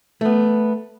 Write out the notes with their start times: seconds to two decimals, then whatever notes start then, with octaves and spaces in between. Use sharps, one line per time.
0.21 A3 B3